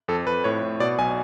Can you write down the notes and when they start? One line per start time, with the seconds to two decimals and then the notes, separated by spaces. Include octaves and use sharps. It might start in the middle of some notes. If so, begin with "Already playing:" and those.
0.08 F2 A4
0.26 F2 B4
0.44 A2 C#5
0.63 A2
0.80 B2 D5
0.98 B1 G#5